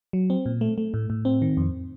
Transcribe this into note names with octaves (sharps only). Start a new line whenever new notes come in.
F#3
C4
A#2
A3
A3
A2
A2
C4
D#3
F2